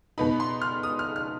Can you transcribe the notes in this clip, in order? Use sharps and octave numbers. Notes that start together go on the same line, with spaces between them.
B2 B3 D#4 B5
C6
F6
D#6
F6
F6